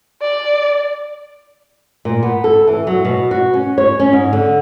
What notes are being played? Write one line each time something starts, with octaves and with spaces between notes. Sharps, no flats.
D5
A#2
B3
A4
E3
F#3
B2
F#4
C#4
C#5
C#4
G#2
D3